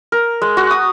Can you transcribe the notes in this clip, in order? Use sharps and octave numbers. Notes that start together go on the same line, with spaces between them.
A#4
G#3
F#4
D#6